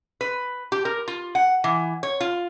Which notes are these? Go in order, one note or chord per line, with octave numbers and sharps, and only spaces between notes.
B4
G4
A#4
F4
F#5
E3
C#5
F4